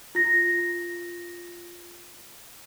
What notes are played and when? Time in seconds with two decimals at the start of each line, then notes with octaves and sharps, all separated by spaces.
0.15 F4 A#6